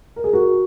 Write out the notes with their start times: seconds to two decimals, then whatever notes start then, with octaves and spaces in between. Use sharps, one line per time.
0.16 A#4
0.24 G#4
0.33 F#4 A#4